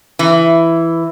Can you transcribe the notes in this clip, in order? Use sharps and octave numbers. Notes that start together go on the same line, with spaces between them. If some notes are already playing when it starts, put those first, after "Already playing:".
E3